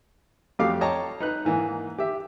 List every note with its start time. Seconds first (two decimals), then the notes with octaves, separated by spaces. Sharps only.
0.59 F2 F#3 A3 G4 F5 D6
0.81 C#5 D#5 G5 A5 A#5 C#6
1.21 D#4 B4 F#6
1.45 G#2 E3 A#3
1.98 G4 E5